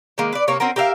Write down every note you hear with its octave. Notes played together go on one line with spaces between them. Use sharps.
D#3 G#3 A#3
B4 D5
C3 A#3 C#5
C4 C#4 F#4 A#4
G4 A#4 E5 F5